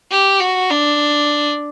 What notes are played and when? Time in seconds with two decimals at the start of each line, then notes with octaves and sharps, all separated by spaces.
0.11 G4
0.40 F#4
0.70 D4